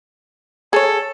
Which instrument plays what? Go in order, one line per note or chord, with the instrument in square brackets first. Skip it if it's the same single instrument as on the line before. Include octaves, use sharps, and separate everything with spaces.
[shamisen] G#4 C#5 [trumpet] A4